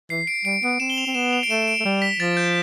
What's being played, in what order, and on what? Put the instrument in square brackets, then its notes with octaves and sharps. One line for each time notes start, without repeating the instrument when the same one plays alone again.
[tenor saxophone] E3 [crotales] C7
[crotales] D7
[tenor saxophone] G3 [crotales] D7
[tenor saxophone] B3 [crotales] D7
[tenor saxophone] C4 [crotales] E7
[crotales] G7
F7
[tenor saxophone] C4
[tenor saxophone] B3 [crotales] E7
[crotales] F7
D7
[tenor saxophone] A3 [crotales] E7
[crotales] E7
D7
[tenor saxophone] A3
G3
[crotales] B6
[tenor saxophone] F3 [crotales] A6
[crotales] G6